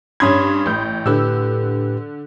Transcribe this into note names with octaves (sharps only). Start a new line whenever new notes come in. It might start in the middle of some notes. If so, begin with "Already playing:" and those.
G2 C#4 B5 C6 D#6 G#6
A1 G6
A2 D3 G4 B4 E6